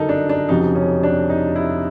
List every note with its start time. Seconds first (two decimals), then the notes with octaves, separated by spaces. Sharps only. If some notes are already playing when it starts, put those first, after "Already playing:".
Already playing: G1 F#2 C#3 D#4 A4 A#4
0.09 D4
0.29 D4
0.49 F1 F2 C#3 F#3 D#4
0.76 C#4
1.03 D4
1.30 D#4
1.56 E4